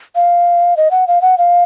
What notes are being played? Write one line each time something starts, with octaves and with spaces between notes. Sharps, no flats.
F5
D#5
F#5
F5
F#5
F5